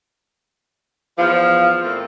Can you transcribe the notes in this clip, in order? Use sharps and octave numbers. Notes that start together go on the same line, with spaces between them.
E2 F3 F5
A#2 A3 C4